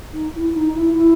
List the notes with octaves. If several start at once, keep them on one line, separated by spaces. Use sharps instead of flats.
D#4
E4
D#4
E4
E4